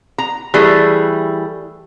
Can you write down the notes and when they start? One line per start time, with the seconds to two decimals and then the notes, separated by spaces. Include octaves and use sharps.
0.18 A#5
0.54 E3 G3 A3 G#4